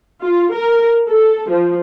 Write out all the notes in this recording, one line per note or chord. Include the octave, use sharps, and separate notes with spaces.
F4
A#4
A4
F3